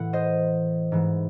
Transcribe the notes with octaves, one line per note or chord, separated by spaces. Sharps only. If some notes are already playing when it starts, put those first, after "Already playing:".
Already playing: A2 E3 F#5
C5 D#5
G#2 E3